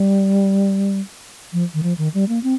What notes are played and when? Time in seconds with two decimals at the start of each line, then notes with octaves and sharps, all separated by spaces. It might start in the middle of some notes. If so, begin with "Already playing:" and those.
Already playing: G3
1.53 F3
1.74 D#3
1.83 F3
1.98 D#3
2.14 G3
2.29 A#3
2.43 C4